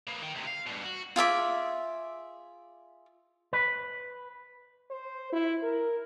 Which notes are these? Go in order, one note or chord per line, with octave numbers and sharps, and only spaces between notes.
A#3 B3
D#3 G5
D2 C3
F5
G2 B2
F#4
F4 G#4 E5 D6
B4
C5
E4
A#4